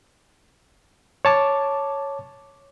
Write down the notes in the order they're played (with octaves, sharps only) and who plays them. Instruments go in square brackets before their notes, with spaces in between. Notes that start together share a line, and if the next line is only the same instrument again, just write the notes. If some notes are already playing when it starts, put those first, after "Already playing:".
[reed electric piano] C#5 A5 D6